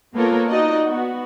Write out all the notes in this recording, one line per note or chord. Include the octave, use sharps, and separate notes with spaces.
A#3 B3 F4 A4 A#4 C#5
D#4 F#4 D5 D#5
B3 F#4